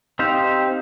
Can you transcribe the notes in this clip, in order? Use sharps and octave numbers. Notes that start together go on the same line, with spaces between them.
C4 D#4 G4 C5 F5